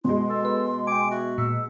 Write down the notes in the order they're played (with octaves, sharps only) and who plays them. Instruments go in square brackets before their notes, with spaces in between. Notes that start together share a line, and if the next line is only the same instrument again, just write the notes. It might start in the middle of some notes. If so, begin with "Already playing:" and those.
[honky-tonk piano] B2 G#3 [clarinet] E4 [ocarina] C6
[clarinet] A4
[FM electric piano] B4
[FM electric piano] G5 G#5 [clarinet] D6
[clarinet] F#4 [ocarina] E5
[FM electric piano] A#2 [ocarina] E6